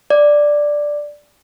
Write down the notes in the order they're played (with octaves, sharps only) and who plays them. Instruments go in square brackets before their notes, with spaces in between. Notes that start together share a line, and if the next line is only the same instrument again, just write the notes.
[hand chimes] D5